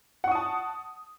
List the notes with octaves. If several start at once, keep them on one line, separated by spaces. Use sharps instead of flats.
F#5 A5 C#6 D#6